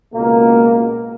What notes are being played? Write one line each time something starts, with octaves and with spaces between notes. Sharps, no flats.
C#2 B2 A#3